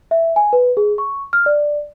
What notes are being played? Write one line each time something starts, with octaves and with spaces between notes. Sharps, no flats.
E5
G#5
B4
G#4
C#6
F6
D5